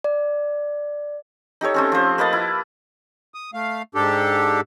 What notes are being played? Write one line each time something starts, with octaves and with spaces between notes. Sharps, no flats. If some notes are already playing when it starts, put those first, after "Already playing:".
D5
D#4 G4 A4 C#5
A3 C4 C#4
F3 C5
A#3 B4 D#5 A5
E4
D#6
A3 F5
G#2 D4 G4 A4